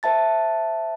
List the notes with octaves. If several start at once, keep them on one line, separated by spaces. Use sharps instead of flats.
C5 E5 A5 A6